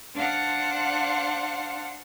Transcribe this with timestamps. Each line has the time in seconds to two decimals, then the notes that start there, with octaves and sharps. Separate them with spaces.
0.14 D4 C5 F5 F#5